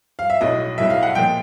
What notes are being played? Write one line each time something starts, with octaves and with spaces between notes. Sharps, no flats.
F5
E5
B1 A2 F#3 D#5
B1 A2 F#3 E5
F5
F#5
A#2 F3 G#3 G5